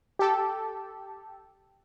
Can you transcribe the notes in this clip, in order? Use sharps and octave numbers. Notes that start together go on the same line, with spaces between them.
G4 A4